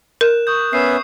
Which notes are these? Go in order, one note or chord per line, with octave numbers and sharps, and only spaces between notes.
A#4 F#6 E7
C#6 D#6 G6
B3 C#4 E5 C7 D#7